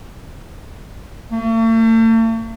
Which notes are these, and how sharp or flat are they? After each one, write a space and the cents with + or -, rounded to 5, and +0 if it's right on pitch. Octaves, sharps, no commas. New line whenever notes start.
A3 +45